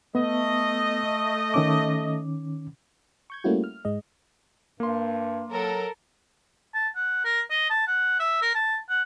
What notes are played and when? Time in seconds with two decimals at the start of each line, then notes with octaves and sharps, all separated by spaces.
0.15 A3 B3 D#5
1.54 D#3 C#4 D6
3.30 C#6 G6 G#6
3.44 G3 A3 A#3 C#4 E4 F#4
3.64 F6
3.85 G#2 G#3 D#5
4.80 G2 A#3 C6
5.51 F#3 A4 A#4
6.74 A5
6.95 F#5
7.25 A#4
7.50 D#5
7.70 A5
7.87 F#5
8.20 E5
8.42 A#4
8.55 A5
8.89 F#5